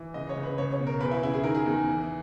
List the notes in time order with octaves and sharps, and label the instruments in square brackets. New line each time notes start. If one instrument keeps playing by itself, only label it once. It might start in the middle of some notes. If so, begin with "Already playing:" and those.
Already playing: [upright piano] E3
C#2 D#5
C#5
C#2
B4
C#2 C#5
C#5
B2
A#4
E2 B4
E4
C#3 E4
G#4
D#3 A#4
G#4
E2
E3